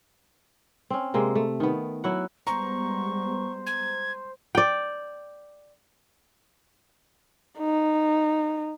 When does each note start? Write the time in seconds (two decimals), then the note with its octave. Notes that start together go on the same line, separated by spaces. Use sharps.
0.90 C4 C#4
1.14 C3 G#3 A#3
1.35 A3
1.60 D#3 B3
2.04 F#3 E4 F#4 F#5
2.47 G3 G#3 B3 C5 A#5 C#6
3.66 G#6
4.55 D5 G5
7.59 D#4